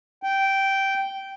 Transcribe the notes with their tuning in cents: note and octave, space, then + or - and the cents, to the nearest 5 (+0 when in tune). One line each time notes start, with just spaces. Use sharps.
G5 -10